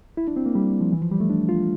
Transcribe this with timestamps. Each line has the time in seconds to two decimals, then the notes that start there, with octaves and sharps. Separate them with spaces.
0.17 E4
0.28 D4
0.36 C4
0.46 A#3
0.55 G3
0.80 F3
0.92 E3
1.02 F3
1.11 G3
1.20 A3
1.30 D4
1.49 F4